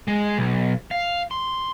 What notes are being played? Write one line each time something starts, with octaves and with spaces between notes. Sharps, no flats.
G#3
B1
F5
C6